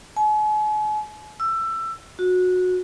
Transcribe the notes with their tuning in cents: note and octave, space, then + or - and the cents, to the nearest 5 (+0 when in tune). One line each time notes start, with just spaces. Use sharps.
G#5 +45
E6 +20
F#4 -20